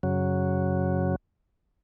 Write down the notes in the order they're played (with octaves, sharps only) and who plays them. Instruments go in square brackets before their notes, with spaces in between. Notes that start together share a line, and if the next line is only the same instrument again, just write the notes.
[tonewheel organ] F#2 C#3 F#3